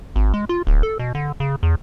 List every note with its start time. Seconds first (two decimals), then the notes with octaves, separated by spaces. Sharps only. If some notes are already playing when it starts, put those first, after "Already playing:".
0.16 G#1
0.34 G#3
0.49 F4
0.67 D1
0.83 A4
0.99 B2
1.15 D3
1.40 C#3
1.63 E2